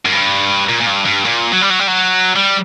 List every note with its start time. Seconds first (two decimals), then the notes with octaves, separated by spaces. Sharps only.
0.05 F#2
0.12 G2
0.69 A#2
0.80 A#2
0.86 G2
1.05 G2
1.25 A#2
1.52 F#3
1.61 G3
1.69 F#3
1.79 G3
1.87 F#3
2.36 G3